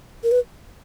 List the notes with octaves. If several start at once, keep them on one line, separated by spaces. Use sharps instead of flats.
A#4
B4